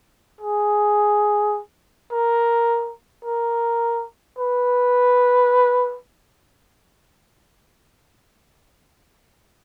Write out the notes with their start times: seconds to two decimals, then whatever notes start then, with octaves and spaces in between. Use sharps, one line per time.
0.41 G#4
2.12 A#4
3.25 A#4
4.39 B4